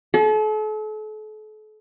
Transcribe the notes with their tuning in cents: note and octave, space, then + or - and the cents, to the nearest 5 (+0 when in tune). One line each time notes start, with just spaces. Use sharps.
A4 -40